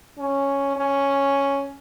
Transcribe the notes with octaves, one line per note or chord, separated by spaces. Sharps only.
C#4
C#4